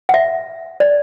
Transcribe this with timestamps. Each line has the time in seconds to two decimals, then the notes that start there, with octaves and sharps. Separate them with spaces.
0.09 F#5
0.14 E5
0.80 D5